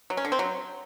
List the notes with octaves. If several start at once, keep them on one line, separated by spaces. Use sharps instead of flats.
F#3
C#4
D3
C4
F#3